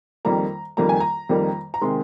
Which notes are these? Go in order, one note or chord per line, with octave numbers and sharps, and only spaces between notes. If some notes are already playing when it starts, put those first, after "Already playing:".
F2 D#3 G3 A#3 A#5
F2 D#3 G3 A#3 A#5
G#5
A#5
F2 D#3 G3 A#3
A#5
C3 D#3 G#3 C6